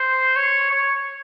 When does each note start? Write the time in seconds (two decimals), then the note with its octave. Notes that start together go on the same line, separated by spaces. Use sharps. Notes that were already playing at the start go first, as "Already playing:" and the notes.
Already playing: C5
0.36 C#5
0.72 C#5